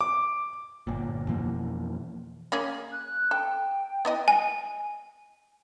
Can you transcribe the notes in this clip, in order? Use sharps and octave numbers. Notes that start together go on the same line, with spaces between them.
D6
G1 A#2
F2 B2 E3 A#3
A#3 C#4 G#4
F#6
A4 G5
B3 E4 D#5
G#5